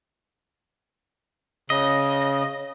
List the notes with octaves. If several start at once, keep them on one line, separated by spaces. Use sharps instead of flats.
C#3 D#5